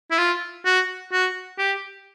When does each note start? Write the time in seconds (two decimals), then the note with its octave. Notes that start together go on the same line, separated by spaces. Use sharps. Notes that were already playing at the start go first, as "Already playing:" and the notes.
0.11 E4
0.18 F4
0.65 F#4
1.12 F#4
1.58 G4